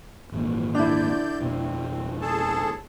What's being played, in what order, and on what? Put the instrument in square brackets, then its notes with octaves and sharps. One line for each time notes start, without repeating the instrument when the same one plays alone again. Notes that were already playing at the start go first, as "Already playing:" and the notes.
[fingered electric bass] G#1 E2 A#2
[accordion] D3 D5 G6 [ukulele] D4 E4
[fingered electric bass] F2 B2 B3 [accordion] C4
[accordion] G#4 A4 A5